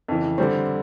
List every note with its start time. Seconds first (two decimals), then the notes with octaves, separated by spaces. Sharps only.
0.08 F2 C#3 E3
0.38 D3 G3 C4